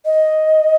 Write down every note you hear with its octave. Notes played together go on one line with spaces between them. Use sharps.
D#5